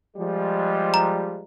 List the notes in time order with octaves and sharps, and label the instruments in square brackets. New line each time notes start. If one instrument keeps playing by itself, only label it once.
[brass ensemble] F3 G3 G#3
[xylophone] A#5